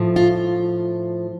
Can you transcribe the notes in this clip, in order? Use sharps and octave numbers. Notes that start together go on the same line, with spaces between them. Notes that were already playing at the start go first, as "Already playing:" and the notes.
Already playing: A2 F3
F4